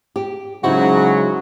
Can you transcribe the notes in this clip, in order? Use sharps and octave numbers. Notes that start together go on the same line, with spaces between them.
G4
C#3 F#3 G#3 D#4 E4 F#4 C5